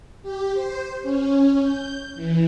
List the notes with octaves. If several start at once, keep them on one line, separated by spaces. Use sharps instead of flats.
G4
C5
C#4
G6
E3